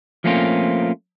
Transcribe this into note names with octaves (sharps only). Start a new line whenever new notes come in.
F3 A3 A#3 C4 C#4 F4